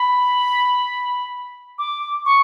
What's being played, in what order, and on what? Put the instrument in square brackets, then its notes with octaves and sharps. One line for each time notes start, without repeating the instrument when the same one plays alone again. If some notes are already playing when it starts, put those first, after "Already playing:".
Already playing: [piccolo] B5
D6
C#6